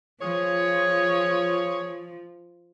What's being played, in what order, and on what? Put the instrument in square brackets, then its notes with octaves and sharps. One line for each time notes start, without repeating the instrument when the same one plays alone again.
[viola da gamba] F3 [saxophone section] F4 G#4 C#5